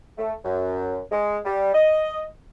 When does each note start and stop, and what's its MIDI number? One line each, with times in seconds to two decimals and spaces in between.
0.18 0.34 57
0.45 1.00 42
1.11 1.39 56
1.45 1.71 55
1.75 2.26 75